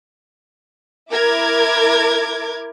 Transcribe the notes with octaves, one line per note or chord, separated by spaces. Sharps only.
E4 A#4 D6 G#6